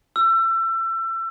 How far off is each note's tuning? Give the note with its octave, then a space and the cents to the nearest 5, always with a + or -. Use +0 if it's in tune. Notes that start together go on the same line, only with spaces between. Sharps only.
E6 +30